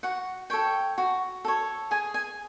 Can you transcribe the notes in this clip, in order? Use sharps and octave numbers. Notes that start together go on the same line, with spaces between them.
F#4 F#5
A4 C#5 G5
F#4
A4 C#5
G#4 G#5
G#5